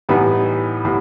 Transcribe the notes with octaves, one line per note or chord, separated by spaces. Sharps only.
A2 E3 G3 B3 D#4
A2 G3 B3